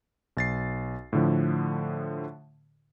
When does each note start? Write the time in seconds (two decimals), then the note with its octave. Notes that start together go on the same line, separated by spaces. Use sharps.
0.37 B1 A6 C7
1.13 A2 D3 F3